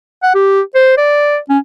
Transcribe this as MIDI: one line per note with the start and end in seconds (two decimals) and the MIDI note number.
0.23 0.34 78
0.34 0.61 67
0.75 0.94 72
0.97 1.38 74
1.49 1.58 61